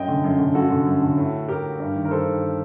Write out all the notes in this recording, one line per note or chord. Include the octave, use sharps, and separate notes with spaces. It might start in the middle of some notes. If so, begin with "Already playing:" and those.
Already playing: F#2 D#5 G5
D3
F#2
D3
F#2 F#4 A4
D3
F#2
D3
A2
A2 G4 A#4
G2
D#3
A#4
G2 A4 C5
D#3